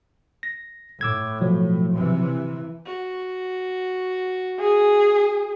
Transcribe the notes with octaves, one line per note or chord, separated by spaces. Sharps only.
A#6
A2 D6 E6 G#6
B2 F3 F#3
C3 E3
F#4
G#4